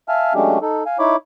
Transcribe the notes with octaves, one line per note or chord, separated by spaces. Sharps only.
E5 F5 G#5 A5 F6
F#3 G#3 A3 C#4 D4 G4
D#4 A4
F5 G#5
D#4 E4 C#5 B5 D6